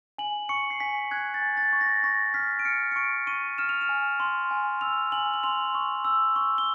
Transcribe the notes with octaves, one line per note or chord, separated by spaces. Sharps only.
G#5 F#7
C#6 C#7
C7
G#5 B6
F#6 G#6
A6
G#5
A6
C#6
A#6
C#6 A#6
F6 B6
D7
F6 C#7
C#7
C#6 D7
C#6 D#7
F6 E7
F7
E7
G#5
C6
G#5
E6 F7
G#5 F#7
F#7
C6 F7
C#6
E6
C#6
G7